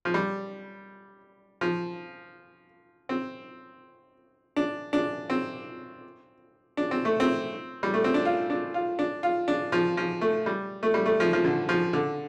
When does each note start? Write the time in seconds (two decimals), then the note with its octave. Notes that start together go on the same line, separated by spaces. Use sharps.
0.05 F3
0.14 G3
1.61 F3
3.09 C4
4.56 D4
4.93 D4
5.30 C4
6.77 D4
6.91 C4
7.05 A3
7.20 C4
7.83 G3
7.94 A3
8.04 C4
8.14 D4
8.25 F4
8.50 D4
8.74 F4
8.99 D4
9.23 F4
9.48 D4
9.72 F3
9.97 F3
10.21 A3
10.46 G3
10.83 A3
10.94 G3
11.06 A3
11.20 F3
11.33 F3
11.44 D3
11.69 F3
11.93 D3